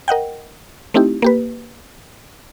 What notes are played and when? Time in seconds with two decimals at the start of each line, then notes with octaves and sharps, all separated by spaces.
0.08 A#4 D#5 F#5 G5
0.94 A3 C4 D#4 E4 G4
1.22 A#3 G4 B4